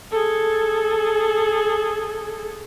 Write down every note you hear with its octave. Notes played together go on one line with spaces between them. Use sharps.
G#4 A4